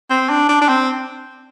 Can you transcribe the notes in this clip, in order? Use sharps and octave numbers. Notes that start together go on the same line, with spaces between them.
C4
D4
D4
D4
C4